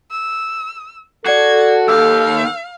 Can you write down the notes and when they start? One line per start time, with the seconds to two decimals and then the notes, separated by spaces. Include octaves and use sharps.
0.10 E6
1.25 F#4 A4 D5 G#6 C7
1.88 D#2 G4 F5 E6 G6